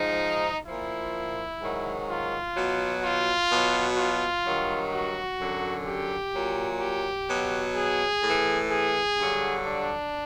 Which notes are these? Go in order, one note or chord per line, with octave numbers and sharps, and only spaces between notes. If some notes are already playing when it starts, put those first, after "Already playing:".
Already playing: G#2 F3 D#4
A#2 F3 E4
G#2 D#3 F#3
F4
B2 F#3
F4
B2 F#3
F4
G2 D#3 F#3
F#4
F#2 D3 F#3
G4
A#2 F#3
G4
B2 F#3
G#4
A2 E3
G#4
G2 D3 F#3
D4